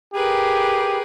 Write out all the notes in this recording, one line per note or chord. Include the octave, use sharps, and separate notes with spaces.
G4 G#4 A#4 B4